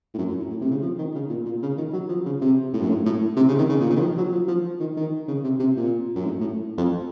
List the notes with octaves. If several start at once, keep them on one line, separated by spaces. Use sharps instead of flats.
A2
F#2
F#2
A2
A2
C3
C#3
F3
D#3
C#3
A#2
A#2
C#3
D#3
F#3
F3
C#3
C3
A2
F#2
A2
A2
C3
C#3
D#3
C#3
A#2
C#3
D#3
F3
F#3
F3
F3
D#3
D#3
C#3
C3
C3
A#2
F#2
A2
A2
F2